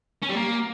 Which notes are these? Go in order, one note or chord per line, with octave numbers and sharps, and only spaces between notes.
C#4
G3
A#3